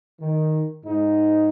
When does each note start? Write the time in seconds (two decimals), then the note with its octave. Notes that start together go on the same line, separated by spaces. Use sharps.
0.20 D#3
0.85 G#2 D#4